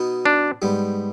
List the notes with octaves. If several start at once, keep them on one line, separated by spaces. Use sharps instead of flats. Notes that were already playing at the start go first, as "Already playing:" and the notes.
Already playing: B2 B3 D#4
D4
G#2 G3 B3